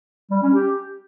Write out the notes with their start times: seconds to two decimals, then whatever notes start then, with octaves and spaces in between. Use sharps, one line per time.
0.30 G3
0.42 C#4
0.54 G4